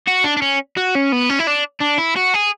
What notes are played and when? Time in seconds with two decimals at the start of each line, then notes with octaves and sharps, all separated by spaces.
0.08 F#4
0.24 D4
0.37 D4
0.42 C#4
0.77 F#4
0.95 C#4
1.12 B3
1.29 C#4
1.39 E4
1.47 D4
1.81 D4
1.98 E4
2.16 F#4
2.34 G#4